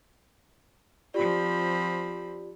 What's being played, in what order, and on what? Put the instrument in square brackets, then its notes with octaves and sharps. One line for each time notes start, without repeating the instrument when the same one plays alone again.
[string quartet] F3 C4 B5 [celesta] F4 G4 D5